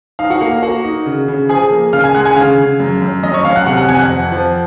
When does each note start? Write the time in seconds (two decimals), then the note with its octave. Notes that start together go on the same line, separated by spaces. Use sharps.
0.19 D#4 F5
0.30 F#4 F#5
0.41 A#3 F5
0.51 F5
0.62 A#3 F#4 F#5
0.84 D#4
1.06 C#3
1.28 C#3
1.49 F3 G#4 G#5
1.71 A#3
1.93 C#3 F5 F6
2.04 G#5 G#6
2.14 G#3 F#5 F#6
2.25 G#5 G#6
2.36 C#3 F5 F6
2.58 C#3
2.80 F#2
3.02 F#2
3.23 F#2 D#5 D#6
3.34 C#5 C#6
3.45 F#2 F5 F6
3.56 F#5 F#6
3.66 C3 F#5 F#6
3.77 F#5 F#6
3.88 F2 G#5 G#6
3.99 F#5 F#6
4.10 F2
4.32 F3